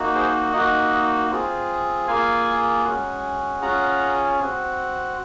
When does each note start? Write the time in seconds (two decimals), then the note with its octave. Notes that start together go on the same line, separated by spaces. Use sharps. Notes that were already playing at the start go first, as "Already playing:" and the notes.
Already playing: A#3 D#4 F#4
0.15 G#4 C5
0.53 A#3 D#4 F#4 D#5 F#5
1.31 C4 F4 G#4
2.07 A#3 F4 G#4 F5 G#5
2.85 G#3 C#4 F#4
3.62 C#4 F4 G#4 F#5 A#5
4.39 C4 F#4